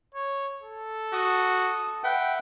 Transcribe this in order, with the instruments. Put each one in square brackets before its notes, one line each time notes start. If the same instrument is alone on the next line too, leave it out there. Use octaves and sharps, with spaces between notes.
[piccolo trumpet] C#5
A4
[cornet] F#4 [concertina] D#6
[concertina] B4 E5 F#5 [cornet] G5